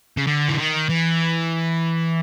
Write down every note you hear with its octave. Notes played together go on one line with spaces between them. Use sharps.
C#3
D3
E3
D#3
E3